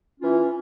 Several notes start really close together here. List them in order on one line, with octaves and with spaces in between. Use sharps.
C#4 F4 E3